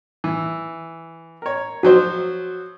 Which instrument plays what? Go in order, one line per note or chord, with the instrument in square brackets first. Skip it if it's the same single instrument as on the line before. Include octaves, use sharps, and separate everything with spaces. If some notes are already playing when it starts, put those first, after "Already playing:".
[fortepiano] E3
A#4 C#5
[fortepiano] F3 F#3 C5 [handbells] F#4